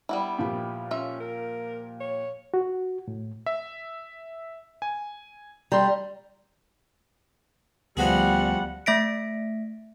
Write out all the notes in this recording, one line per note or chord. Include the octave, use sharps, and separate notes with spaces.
G3 B3 E4
A#2 F3 G4
C#4 F4 E5
A#4
C#5
F#4
A2
E5
G#5
G3 A#5 C6
D2 F3 G3 B3 F#4 G#4 F#5 F#6
A3 E5 A#6 B6 D7